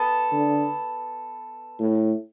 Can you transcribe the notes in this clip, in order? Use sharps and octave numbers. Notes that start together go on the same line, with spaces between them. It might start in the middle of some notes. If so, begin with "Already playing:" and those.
Already playing: B3 A4
D3
A2